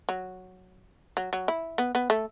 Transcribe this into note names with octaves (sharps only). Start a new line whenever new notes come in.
F#3
F#3
F#3
E4
B3
B3
A3